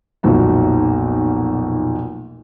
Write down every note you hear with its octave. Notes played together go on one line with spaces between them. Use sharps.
F1 B1 A#2 D#4 F#4